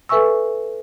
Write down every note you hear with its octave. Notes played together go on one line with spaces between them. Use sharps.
A4 B4 E5 G#5 C#6 E6